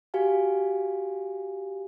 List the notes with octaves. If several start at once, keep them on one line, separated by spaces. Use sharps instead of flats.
F#4 G4 F5 G#5